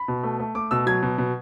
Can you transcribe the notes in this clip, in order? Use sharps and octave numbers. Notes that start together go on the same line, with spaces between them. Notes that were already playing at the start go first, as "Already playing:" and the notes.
Already playing: B5
B2
A3
A3
A3 D6
B2 E6
F#3 G#6
B2
B2